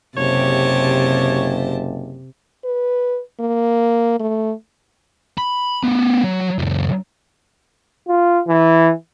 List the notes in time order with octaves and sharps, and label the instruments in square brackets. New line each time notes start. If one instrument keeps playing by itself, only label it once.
[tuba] F#1 [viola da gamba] C3 [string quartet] G4 C5 A5 [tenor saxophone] C#5
[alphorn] B4
A#3
A3
[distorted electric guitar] B5
A3 B3
F#3
C#2 F#2
[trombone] F4
E3